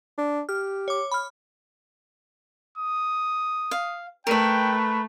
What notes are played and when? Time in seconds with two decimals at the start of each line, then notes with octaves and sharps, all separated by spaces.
0.18 D4
0.49 G4 F6
0.88 C#5 D6
1.11 B5 F6
2.78 D#6
3.71 F5
4.27 A3 A#4 B4 G5